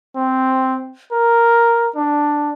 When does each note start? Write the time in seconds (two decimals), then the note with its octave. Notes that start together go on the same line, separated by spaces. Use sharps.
0.16 C4
1.12 A#4
1.95 D4